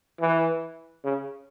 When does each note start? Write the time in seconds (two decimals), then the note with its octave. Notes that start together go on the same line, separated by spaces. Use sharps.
0.21 E3
1.04 C#3